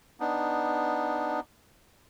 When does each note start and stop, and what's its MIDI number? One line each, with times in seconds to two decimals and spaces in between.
0.20 1.40 59
0.20 1.40 62
0.20 1.40 63